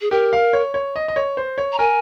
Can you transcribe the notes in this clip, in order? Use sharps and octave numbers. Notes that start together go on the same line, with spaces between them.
G#4
G4 A#4
F5
C#5
C#5
D#5
D#5
C#5
C5
C#5
A#5
A#4 G#5